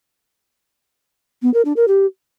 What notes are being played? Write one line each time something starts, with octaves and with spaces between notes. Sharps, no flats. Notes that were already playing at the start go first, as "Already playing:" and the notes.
B3
A#4
D4
A#4
G4